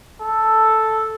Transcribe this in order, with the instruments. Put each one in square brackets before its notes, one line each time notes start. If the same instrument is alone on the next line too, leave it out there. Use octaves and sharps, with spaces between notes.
[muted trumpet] A4